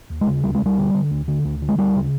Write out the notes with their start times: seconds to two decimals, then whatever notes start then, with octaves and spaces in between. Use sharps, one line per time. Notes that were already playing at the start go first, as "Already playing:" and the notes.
0.10 D#2
0.21 G#3
0.27 C#3
0.44 D2 G3
0.55 G#3
0.61 D2 G3
0.78 D3
0.94 D3
1.11 D2
1.28 D3
1.44 D2
1.62 D3
1.69 G#3
1.78 D2 G3
1.95 C#3